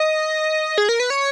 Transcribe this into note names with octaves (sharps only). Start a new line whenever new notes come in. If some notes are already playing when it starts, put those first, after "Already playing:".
Already playing: D#5
G#4
A#4
B4
C#5